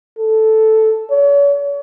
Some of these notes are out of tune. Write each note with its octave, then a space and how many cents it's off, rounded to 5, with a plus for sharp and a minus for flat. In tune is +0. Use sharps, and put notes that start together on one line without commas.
A4 -5
C#5 +40